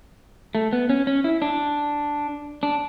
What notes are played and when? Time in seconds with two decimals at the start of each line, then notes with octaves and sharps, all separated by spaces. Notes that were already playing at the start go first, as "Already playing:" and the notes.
0.55 A3
0.73 B3
0.89 C#4
1.07 C#4
1.24 E4
1.42 D4
2.63 D4